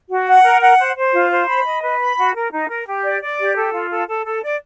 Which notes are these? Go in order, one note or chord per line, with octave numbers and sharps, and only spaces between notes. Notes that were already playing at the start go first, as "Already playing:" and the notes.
F#4
F#5
A#4
F#5
C5
C5
F4
C5
B5
D#5
B4
B5
F#4
A#4
D#4
A#4
G4
D5
D5
G4
A4
F4
A4
A4
A4
D5